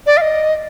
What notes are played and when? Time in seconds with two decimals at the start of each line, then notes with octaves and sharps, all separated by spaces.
0.06 D5
0.17 F5
0.21 D#5